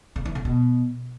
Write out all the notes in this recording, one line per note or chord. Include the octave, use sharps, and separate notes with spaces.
C#3
E3
C#3
B2